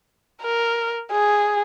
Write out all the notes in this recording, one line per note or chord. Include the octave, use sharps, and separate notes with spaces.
A#4
G#4